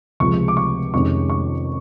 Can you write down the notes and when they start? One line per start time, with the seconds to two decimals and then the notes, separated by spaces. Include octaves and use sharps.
0.20 C#2 C3 F3 G#3 C#6
0.48 D6
0.57 C#6
0.93 F2 C3 D#3 G#3 C#4 C#6
1.30 C#6